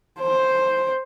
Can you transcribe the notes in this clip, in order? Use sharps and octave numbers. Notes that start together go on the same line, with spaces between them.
C5